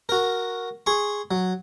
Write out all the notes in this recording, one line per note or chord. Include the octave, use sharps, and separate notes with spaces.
F#4 A#4
G#4 C6 C#6
F#3